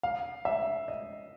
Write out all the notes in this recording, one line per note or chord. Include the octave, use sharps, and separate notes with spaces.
F5
E5
D#5